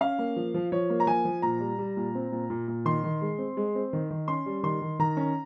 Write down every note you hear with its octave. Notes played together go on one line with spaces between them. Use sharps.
C#4 F5
A#3
F3
F3
F3 C#5
A#3
A#5
F3 G#5
F3
A#2 A#5
G3
G3
A#2
C4
A#2
A#2
A#2
D#3 C6
D#3
G#3
C4
G#3
C4
D#3
D#3
C#4 C6
G3
D#3 C6
D#3
D#3 A#5
C#4